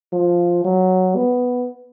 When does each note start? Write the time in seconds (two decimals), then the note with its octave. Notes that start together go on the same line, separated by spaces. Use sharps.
0.13 F3
0.64 F#3
1.16 B3